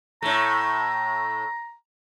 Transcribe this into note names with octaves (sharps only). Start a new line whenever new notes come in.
A2 A3 A#5